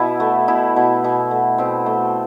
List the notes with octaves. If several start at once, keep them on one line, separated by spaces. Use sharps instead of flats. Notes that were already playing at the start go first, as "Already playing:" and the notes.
Already playing: B2 E4
A3
B2 E4
B2
B2
A3
B2 C4
A3